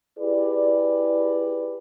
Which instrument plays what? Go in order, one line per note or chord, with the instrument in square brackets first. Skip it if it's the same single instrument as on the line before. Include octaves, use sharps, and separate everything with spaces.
[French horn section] E4 G4 G#4 B4 D5